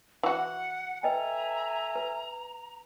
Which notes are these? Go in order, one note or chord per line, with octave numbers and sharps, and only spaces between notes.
E3 F#4 F#5
A4 B4 D#5 E5 G5 G#5 A#5
B4